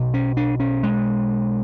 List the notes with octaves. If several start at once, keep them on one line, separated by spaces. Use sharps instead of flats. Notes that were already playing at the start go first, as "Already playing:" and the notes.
Already playing: B1 B2
C#4
D4
C#4
G#3